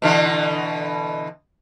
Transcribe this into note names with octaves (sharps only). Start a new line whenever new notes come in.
B2 D3 E3